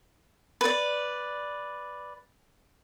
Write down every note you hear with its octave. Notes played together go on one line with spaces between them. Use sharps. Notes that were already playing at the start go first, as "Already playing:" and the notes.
B4 D5